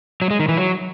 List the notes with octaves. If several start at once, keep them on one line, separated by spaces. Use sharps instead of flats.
F#3
G#3
D#3
E3
F#3